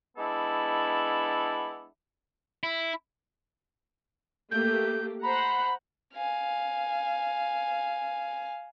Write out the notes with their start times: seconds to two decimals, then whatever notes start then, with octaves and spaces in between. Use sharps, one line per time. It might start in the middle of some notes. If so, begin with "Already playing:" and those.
0.17 G#3 B3 D4 E4 A4
2.63 E4
4.51 A3 A#3 G4 G6
5.23 C5 F#5 A#5 B5
6.14 F5 G#5